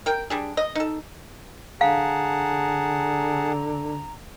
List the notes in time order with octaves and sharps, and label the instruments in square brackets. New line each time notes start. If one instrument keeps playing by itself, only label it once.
[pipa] A#4 G5
G3 D4 G#4
D#5
D#4 A4
[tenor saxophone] D3 [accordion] G#4 F#5 A5 [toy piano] F5 [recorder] A#5